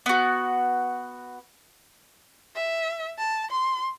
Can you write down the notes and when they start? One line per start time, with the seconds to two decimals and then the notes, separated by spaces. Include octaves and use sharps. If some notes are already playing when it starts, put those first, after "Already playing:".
0.06 B3 F#4
2.55 E5
3.18 A5
3.51 C6